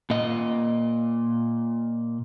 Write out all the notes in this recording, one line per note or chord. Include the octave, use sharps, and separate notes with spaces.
A#2 D#5